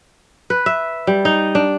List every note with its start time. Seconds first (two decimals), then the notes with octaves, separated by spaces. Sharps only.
0.50 B4
0.66 E5
1.07 G3
1.25 D#4
1.55 D4